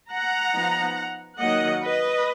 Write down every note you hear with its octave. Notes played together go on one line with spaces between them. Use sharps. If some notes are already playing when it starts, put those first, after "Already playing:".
F#5 A#5
F3 B3 D#4
D#3 F#3 A#3 D#5 F#5
B4 D#5